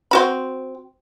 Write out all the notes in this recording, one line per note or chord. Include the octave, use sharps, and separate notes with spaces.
C4 F#4 B5